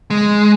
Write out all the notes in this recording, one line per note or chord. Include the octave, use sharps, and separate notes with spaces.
G#3